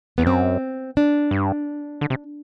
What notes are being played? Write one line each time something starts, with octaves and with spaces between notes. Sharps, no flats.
E2 B3
F#2 C4
D4
G2
D3
C3